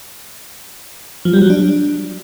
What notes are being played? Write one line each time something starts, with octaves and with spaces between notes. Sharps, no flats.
F3
G3
F#3
D4